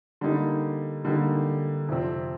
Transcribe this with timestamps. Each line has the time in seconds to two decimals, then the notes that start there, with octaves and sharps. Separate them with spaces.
0.21 D3 G3 A#3 D#4
1.05 D3 G3 A#3 D#4
1.88 F2 C3 F3 C4